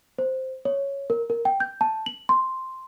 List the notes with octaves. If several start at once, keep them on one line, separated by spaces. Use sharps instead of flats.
C5
C#5
A#4
A#4
G5
G6
A5
F#7
C6